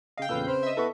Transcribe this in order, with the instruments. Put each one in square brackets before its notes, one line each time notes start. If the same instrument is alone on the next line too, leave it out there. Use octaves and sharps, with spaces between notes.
[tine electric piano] C#3 D#5 [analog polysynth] F5 G5
[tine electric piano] E2 A#2 [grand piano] C#3 B4 E6 [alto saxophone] A4
[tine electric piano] C4 B5 [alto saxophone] C5
[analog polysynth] D#5 E5
[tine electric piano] B3 E4 [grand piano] A4 C#6 [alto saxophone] B4